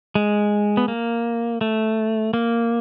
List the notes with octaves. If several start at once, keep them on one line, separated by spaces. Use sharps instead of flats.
G#3
B3
A#3
A3
A#3